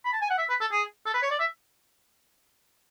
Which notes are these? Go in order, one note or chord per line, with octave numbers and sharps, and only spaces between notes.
B5
A5
G#5
F#5
E5
B4
A4
G#4
A4
B4
C#5
D5
E5